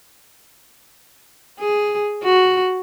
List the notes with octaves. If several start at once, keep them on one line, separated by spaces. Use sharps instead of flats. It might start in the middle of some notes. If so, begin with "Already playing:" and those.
G#4
F#4